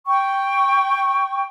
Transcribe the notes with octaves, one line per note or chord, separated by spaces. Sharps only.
G5 C#6